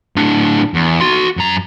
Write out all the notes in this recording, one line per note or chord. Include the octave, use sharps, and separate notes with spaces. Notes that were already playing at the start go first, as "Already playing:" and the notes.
A2 D4
E2
F#4 C6
F#2 A#5